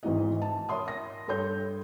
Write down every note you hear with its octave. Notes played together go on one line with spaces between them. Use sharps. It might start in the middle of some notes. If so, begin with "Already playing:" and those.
G#1 G#2 E3 D#5
A5
A#4 C#5 E5 C6 D#6
A#6
G2 A4 C#5 C6 G6